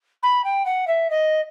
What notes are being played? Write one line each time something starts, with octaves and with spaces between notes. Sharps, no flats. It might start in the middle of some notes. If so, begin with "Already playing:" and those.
B5
G5
F#5
E5
D#5